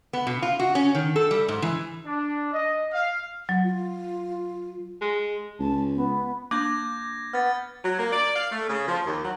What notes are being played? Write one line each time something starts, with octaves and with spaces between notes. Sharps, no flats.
B3
B2
F4
F#4
C#4
D#3
A4
G3
G#2
E3
D4
D#5
F5
F#3
F4
G#3
C#2 A5
B3
A#3 D4 D6 G6 G#6 A#6
B3 F6 A6
F#3
A#3
D5
F5
A3
C#3
F3
D#2
F#3